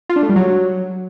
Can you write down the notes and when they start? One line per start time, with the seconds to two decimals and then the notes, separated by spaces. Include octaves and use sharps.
0.09 F4
0.16 D4
0.23 A3
0.29 G3
0.36 F#3